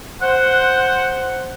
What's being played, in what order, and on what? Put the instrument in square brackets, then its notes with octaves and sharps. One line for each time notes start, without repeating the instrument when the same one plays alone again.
[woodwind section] C5 F#5